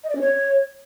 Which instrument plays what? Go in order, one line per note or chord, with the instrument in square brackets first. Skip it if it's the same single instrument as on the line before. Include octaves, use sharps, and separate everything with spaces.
[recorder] D#5
D5
C#4
C#5